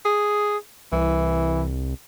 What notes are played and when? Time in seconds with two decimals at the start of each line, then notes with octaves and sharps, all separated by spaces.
0.06 G#4
0.92 C2 E3